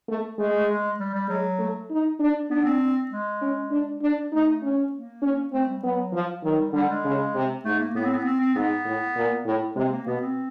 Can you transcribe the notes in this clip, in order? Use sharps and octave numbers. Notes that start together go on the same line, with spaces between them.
A3
G#3 A3
A3
G#3
G3
G3
F#3 G#3
A3
D#4
D4
B3 D4
C4
G#3
C#4
D4
D4
A3 D#4
C#4
A#3
C#4
A3 C4
G3
F#3 B3
F3
D#3 F#3
G3
D3 G3
G#3
C#3
C3
G#2 A3
A#3
A2 B3
C4
B3
C4
C4
G#2 B3
A2
A#2
A2
C3 G#3
A#3
B2 B3
C4